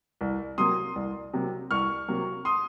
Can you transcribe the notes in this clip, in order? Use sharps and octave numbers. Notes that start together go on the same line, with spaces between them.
C2
C3 F#3 A#3 C6 D#6
C2
C3 F#3 A#3
C2 C#6 F6
C3 F#3 A#3
C6 D#6